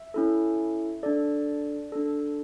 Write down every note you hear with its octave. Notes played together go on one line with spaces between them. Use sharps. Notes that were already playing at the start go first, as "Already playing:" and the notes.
Already playing: E5
C#4 E4 A4
D4 A4 D5
D4 A4